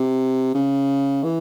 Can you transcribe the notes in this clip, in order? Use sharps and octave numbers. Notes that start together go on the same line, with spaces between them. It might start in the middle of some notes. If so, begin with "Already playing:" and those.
Already playing: C3
C#3
E3